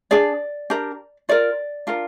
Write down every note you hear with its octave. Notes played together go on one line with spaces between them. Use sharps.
D4 G#4 D5
D4 G4 A#4
F4 A#4 D5
D4 F4 A#4